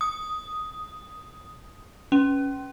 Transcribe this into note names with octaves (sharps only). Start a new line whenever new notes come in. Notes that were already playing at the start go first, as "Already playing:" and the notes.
D#6
C#4